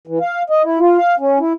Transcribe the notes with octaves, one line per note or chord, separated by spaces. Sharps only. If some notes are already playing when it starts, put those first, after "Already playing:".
E3
F5
D#5
E4
F4
F5
C#4
E4